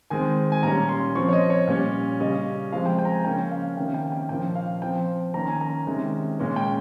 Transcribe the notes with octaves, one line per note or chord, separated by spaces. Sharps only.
D#3 G#3 C4 G#5
G#5
A#2 G3 C#4 A#5
C6
F3 C4 C#6
C#5
D#5
C#5
A#2 G3 C#4
C#3 G3 C#4 D#5
F3 G#3 C4 F5
G5
G5
A#5
G#5
C#3 F3 A#3 C#4 G5
F5
C3 D#3 A#3 C#4 G5
G5
G5
A#2 F3 A#3 C#4 G5
F5
F3 C4 G5
D#3 A#3 C#4 A#5
G#5
A#5
C3 D#3 G#3 C#4
A#2 G#3 C#4
G5